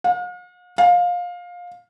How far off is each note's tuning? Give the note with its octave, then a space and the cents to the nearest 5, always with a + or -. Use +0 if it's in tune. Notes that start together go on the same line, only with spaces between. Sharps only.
F5 +45
F5 +20